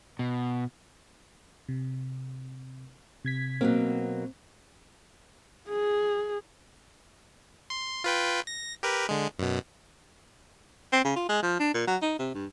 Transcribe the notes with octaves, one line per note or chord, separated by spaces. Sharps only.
B2
C3
C3 G#6 B6
B2 F#3 A#3 C4
G#4
C6
F4 B4 G5
A#6
G4 A#4 B4
D3 G#3
F#2 B2
C4
C#3
F4
G#3
F3
D4
A#2
F#3
D#4
C3
G2